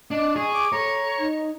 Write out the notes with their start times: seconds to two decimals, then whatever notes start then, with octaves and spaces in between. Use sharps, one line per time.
0.11 D4 D#5
0.36 G#4 C#6
0.54 D6
0.72 A4 C#5 A#5
1.18 D#4